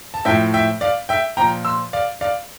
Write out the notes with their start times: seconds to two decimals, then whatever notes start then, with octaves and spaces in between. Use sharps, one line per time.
0.14 A5
0.25 A2 F3 E5 G5
0.54 E5 G5
0.81 D5 F5
1.09 E5 G5
1.37 A#2 F3 G5 A#5
1.65 C6 E6
1.93 D5 F5
2.21 D5 F5